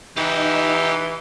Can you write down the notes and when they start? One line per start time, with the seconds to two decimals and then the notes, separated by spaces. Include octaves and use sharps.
0.17 E3 D#4 G4 F#5